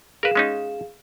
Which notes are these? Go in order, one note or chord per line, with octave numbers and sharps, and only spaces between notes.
G#4 A#4 B4 F5 E7
G#3 C#4 D#4